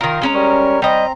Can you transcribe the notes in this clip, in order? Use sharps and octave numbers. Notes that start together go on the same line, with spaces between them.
D#3 F4 A#4 F5
G#3 C#4 A#5
G3 A#4 C#5
G3 C4 D#5 A#5